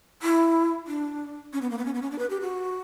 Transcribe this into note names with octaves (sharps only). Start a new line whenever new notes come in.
E4
D4
C#4
B3
A#3
B3
C#4
B3
C#4
D4
B4
G4
F#4